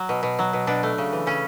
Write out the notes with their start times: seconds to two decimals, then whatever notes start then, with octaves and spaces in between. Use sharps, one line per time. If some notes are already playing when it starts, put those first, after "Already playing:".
Already playing: F#3
0.09 B2
0.23 B2
0.39 F#3
0.53 B2
0.67 B2 D4
0.83 A3
0.98 C#3
1.13 E3
1.26 C#3 C#4